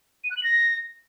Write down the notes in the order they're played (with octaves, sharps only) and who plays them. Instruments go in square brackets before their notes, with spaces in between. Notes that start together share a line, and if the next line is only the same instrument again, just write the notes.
[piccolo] D#7
F#6
F#7
A#6